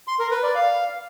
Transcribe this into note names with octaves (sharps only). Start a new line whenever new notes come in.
C6
A#4
B4
D5
F5